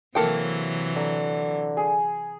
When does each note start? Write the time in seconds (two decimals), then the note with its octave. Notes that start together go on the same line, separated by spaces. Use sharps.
0.15 C3 E3 F#3 A#3 A4 C#5 G5
0.96 D3 A#5
1.77 G#4